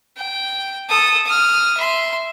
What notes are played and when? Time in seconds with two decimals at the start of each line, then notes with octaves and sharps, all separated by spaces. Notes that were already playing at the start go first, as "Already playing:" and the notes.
0.17 G5
0.89 A4 D#6
1.26 D#6 F6
1.78 E5 C6